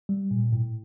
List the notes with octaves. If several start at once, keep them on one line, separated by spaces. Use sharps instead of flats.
G3
A#2
A2